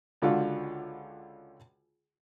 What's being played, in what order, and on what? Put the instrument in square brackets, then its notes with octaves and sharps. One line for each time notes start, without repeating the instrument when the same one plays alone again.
[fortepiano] C#2 D3 F4 F#4